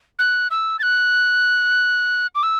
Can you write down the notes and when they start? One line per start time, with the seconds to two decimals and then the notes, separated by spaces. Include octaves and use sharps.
0.19 F#6
0.51 E6
0.79 A6
0.83 F#6
2.35 D6
2.43 E6